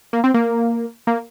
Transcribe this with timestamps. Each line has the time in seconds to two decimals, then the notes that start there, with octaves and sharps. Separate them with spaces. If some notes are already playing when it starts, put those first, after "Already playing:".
0.13 A#3
0.24 C4
0.34 A#3
1.07 A#3